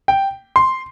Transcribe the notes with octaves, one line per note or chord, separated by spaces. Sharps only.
G5
C6